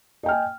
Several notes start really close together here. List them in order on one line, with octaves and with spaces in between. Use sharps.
D#5 G5 F6 G#5